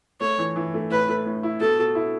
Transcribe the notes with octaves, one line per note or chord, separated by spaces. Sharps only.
A3 C#5
E3
E3
A3
A2 B4
A3
A2
E4
B2 A4
B2
E4